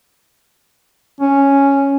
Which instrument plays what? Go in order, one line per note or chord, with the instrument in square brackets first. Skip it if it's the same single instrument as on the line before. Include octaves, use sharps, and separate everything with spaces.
[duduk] C#4